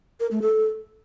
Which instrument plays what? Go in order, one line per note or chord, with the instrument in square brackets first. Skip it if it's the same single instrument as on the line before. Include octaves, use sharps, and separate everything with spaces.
[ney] A#4
A3
A4